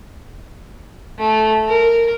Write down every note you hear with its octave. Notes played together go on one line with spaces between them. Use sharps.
A3
A#4